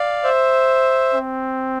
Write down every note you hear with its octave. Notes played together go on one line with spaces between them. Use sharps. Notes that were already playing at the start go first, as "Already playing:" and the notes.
Already playing: D5 F5
C5 E5
C4